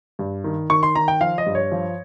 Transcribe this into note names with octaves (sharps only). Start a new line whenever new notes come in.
G2
D#3
D#3 C#6
C6
D#3 A#5
G5
F3 F5
D#5
G2
C#5
F3